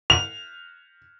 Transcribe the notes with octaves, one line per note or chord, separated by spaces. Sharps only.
F7